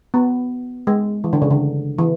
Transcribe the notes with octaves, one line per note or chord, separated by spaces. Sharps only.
B3
G#3
E3
D3
C#3
D3
E3